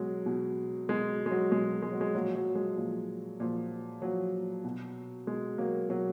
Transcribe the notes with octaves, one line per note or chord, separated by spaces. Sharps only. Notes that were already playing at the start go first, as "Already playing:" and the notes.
Already playing: B2 F#3 G#3
B2
B2 G#3
G#3
F#3
B2 G#3
G#3
F#3
G#3
A#2 F3 F#3
F#3
G#3
A#2 F3
A#2 F3
A#2 F3 F#3
B2
B2 G#3
F#3 A#3
B2 F#3